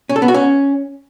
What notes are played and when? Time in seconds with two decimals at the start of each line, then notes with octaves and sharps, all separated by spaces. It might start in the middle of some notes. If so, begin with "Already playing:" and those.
0.10 C#4
0.16 A4
0.22 B3
0.28 F#4
0.34 C#4